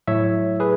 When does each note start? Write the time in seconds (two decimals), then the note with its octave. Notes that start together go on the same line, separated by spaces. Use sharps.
0.08 A2 F#3 A3 C#5 E5
0.60 G#4 B4